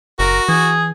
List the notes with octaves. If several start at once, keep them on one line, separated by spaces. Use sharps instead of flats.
F#1 F#4 A#4
E3 G#4